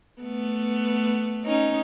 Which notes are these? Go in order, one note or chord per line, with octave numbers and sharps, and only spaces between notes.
A3 B3
C#4 D#4